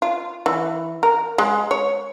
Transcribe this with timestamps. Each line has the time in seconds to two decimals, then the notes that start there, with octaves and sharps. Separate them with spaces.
0.02 F4
0.46 E3
1.03 A#4
1.38 G#3
1.71 C#5